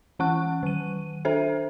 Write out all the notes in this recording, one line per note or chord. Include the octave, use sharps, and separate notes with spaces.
E3 C#4 F#5 C#6 F#6
D#3 D#7
D4 A4 C5 E5